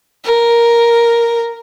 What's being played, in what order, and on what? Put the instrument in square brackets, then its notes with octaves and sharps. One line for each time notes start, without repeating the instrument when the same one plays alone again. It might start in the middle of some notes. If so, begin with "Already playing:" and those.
[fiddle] A#4